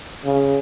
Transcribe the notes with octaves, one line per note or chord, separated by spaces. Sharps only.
C#3